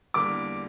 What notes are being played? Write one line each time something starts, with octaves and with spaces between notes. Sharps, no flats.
E2 D3 G3 A#3 D6